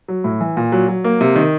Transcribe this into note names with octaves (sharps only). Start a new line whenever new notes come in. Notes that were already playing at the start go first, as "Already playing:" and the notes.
F#3
A2
E3
A#2
F#3
F#3
A#3
C3
D#3